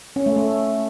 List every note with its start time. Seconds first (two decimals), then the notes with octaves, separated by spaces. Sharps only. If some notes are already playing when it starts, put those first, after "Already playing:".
0.16 C#4
0.26 A3
0.36 A3